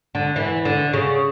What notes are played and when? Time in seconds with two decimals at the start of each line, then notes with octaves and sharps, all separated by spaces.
0.15 D3
0.36 E3
0.65 D3
0.93 C#3